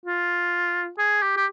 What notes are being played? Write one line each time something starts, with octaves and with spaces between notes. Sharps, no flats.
F4
G#4
G4
G4